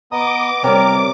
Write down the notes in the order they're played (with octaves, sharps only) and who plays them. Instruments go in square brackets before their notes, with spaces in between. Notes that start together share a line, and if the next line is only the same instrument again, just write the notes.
[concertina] B3 D#5 D#6 [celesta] A#5 [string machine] D6
[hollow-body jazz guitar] C3 G3 [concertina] A#4 [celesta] C5 C#5 G5